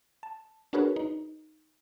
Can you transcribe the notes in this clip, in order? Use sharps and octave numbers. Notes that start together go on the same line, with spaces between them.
A5
D4 F#4 G#4 A#4 B4 C#5
D#4